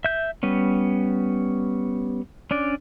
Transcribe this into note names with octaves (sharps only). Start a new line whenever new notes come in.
E5 G6
G3 B3 C#4
C#4 D4 D5